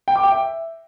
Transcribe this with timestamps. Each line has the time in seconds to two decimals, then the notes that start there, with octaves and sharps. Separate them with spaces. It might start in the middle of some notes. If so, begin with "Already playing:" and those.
0.08 G5
0.16 D6
0.24 G5
0.32 E5